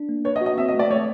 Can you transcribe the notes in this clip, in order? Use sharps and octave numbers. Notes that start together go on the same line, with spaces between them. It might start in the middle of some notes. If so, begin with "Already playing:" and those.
Already playing: D4
A#3
B4 C#5
D#5
F#4
D#5
C4 E5
D#5
A3
D5
A3 C#5